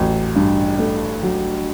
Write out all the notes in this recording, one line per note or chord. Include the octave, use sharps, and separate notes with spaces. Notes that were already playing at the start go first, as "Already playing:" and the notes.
Already playing: A1 F#3
G2
A3
F#3